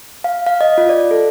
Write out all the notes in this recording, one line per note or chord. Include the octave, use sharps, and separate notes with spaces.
F5
F5
D#5
F4
D5
A4